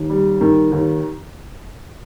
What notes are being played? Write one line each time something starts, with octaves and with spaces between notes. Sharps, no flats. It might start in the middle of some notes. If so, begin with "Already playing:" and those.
Already playing: D#2
G3
D#3
D#2